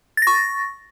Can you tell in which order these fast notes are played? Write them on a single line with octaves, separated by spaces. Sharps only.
A6 A#6 C#6